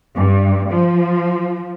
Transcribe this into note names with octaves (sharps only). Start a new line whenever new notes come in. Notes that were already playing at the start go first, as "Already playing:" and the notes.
G2
F3